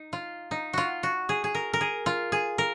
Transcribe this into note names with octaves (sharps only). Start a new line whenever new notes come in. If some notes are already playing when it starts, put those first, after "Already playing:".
Already playing: D#4
F4
D#4
F4 F#4
F#4
G#4
G#4
A#4
A#4
G#4
F4
G#4
A#4